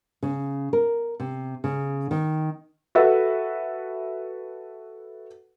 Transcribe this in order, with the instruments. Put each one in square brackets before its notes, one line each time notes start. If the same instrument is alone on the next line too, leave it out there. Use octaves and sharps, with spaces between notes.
[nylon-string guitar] C#3
A#4
C3
C#3
D#3
[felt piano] F#4 A4 B4 E5